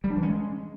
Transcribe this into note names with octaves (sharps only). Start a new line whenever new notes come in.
G3
D4
E3
C#4
G#3